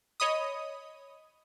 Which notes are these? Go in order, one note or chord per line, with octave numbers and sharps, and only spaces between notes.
C#5 D#5 B5 D#6